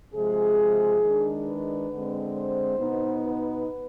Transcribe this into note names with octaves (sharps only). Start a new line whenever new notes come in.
C3 F3 G#3 G#4
D#3 G#3 D4
B4
D3 G#3 C4
C5
B2 B3 D#4
B4